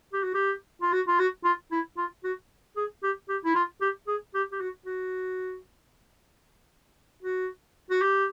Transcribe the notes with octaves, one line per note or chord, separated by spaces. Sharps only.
G4
F#4
G4
F4
F#4
F4
F#4
F4
E4
F4
F#4
G#4
G4
G4
E4
F4
G4
G#4
G4
G4
F#4
F#4
F#4
F#4
G4